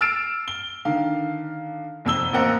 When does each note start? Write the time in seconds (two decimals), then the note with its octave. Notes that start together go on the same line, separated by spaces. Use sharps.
0.01 E6 F6 A6 C7 D7 E7
0.48 G7
0.85 D3 D#3 F5
2.05 F1 F2 E6 G7
2.33 A1 A#3 C4 F#5 A#5